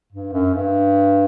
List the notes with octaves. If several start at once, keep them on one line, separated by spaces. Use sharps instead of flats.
G2
F#2
G2